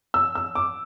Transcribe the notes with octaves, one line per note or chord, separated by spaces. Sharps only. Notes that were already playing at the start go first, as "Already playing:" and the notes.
E6
E6
D6